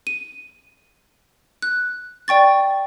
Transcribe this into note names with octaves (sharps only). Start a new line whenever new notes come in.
D#7
F#6
D5 G5 C#6 A6